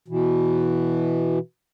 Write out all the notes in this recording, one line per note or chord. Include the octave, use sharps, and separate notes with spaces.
B2 E3